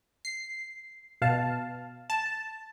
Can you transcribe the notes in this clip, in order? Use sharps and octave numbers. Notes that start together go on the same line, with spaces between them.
C7
B2 F5 A5
A5